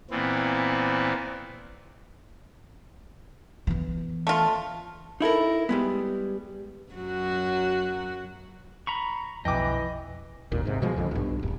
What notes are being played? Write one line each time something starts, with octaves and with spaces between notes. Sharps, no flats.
A#2 E3 B3 C4
E3 B3
A3 F4
D#4 E4 A4 A#4
G3 G#3 B3
F#2 F#3 F#4
A#5 B5 C#6
B1 F2 E3 D#5 G5 D6
G#1 D#2 A#2
G#2 C3
B2 F3 F#3 G#3
A#1 F2 D3
B1 G2
D#1